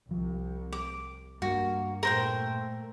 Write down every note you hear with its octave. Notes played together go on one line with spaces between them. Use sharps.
C2 F3
D6
G2 A#3 F#4
A#2 A3 A#4 C5 G5